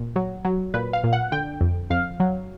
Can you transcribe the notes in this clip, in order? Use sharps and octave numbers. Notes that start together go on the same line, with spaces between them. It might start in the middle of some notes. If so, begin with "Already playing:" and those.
Already playing: A#2
F#3
F#3
A#2 B4
F5
A#2
F#5
D3 G5
F2
F2 F5
F#3